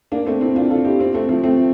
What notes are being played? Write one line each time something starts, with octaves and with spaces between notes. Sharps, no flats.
A#3 D4
A3 C4
C4 E4
D4 F4
F4 A4
E4 G4
C4 E4
A3 C4
F3 A3
A3 C4